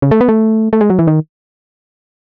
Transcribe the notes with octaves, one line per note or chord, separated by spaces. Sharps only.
C#3
A3
B3
A3
A3
G#3
F#3
E3
D#3